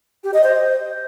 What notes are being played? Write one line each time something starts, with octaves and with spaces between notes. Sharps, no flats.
G4
D#5
C5